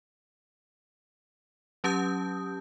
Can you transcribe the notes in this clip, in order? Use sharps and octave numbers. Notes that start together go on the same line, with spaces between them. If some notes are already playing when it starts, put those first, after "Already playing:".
F#3 C#4 G4 A5 D#6 G6